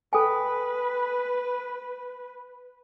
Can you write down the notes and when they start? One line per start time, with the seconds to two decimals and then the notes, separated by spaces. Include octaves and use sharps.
0.13 A4 B4 G5 G#5